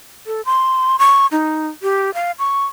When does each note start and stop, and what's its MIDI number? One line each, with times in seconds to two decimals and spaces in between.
0.27 0.41 69
0.45 0.97 84
0.99 1.26 85
1.32 1.67 63
1.83 2.13 67
2.14 2.32 77
2.39 2.64 85